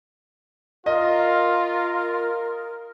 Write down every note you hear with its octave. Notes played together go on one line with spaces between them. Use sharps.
F4 A#4 D#5